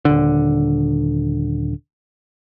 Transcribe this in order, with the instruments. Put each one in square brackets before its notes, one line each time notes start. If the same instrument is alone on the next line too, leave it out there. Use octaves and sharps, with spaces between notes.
[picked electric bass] D#1 D3